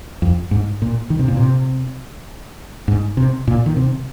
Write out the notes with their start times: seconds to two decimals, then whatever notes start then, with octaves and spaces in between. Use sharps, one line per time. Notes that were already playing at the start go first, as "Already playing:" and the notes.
0.22 F2
0.51 G#2
0.82 A#2
1.10 D#3
1.19 C3
1.28 A#2
1.37 C3
2.88 G#2
3.17 C3
3.48 A#2
3.66 D#3
3.77 C3